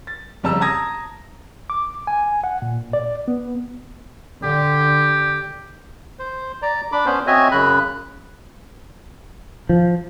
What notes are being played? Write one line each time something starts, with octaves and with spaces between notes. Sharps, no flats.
A6
F2 C#3 G3 A5 A#5 E6
A5 A#5 D#6 G#6 A#6
D6
G#5
F#5
A#2
D5
B3
D3 G4
C5
D5 A#5
D4 B5 D6
B3 C#4 C5
C4 F#4 C#5 D#5 E5 G#5
F#2 C#3 B5 F#6
F3